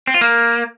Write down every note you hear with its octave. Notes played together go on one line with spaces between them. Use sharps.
C4
F4
A#3